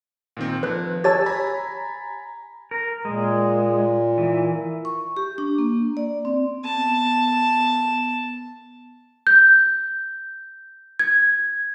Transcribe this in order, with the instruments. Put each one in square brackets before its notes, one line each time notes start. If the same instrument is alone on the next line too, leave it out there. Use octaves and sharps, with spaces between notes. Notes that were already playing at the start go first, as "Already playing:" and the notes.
[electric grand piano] A#2 D#3 C4
[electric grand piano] F3 [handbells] B4 F#6
[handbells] G4 C#5 A5 [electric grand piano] G#5 E6 A6
[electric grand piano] G#5 A#5 B5
[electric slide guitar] A#4
[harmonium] A#2 [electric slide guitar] G#3
[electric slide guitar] E3
[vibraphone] C#6
G4
D4
A#3
D5
C4
[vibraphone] B3 [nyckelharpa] A5
[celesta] G6
G#6